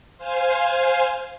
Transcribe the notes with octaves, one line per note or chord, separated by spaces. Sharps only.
C5 F5 G#5